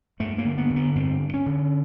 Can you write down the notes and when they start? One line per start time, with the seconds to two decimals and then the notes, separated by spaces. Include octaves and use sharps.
0.20 G2 A3
0.38 A#3
0.45 D3
0.58 B3
0.70 D3
0.76 B3
0.95 G2 C4
1.21 G2
1.34 C#4
1.46 D3